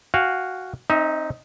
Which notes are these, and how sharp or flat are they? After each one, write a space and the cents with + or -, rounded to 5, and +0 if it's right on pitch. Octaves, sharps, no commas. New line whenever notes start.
F#4 +0 F5 +0 G#5 -40
C4 +35 D#4 +0 E5 -30